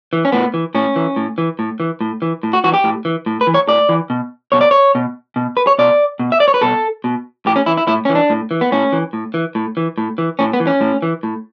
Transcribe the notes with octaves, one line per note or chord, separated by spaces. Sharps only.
E3
C#4
A2 B3
E3
A2 C#4
E3
A2
E3
A2
E3
A2
E3
A2
F#4
E3 F#4
G4
A2
E3
A2
B4
E3
C#5
A2 D5
E3
B2
B2 C#5
D5
C#5
B2
B2
B4
C#5
B2 D5
B2
E5
D5
C#5
B4
B2 A4
B2
A2 G4
C#4
E3 E4
E4
A2 E4
E3 C#4
D4
A2
E3
B3
A2 C#4
E3
A2
E3
A2
E3
A2
E3
A2 C#4
B3
E3
C#4
A2
E3
A2